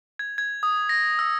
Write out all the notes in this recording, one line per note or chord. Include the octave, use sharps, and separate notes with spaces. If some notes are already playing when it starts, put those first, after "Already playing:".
G#6
G#6
D#6
A#6
E6